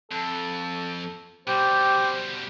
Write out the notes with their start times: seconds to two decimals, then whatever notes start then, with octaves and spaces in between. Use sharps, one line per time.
0.12 F2 A4
1.47 B2 G3 G4 C5